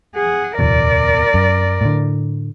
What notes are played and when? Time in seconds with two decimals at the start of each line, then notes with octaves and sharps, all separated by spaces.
0.15 G#4 F#5
0.59 D1 E2 B2 A#4 D5
1.34 F#2
1.81 A2 D3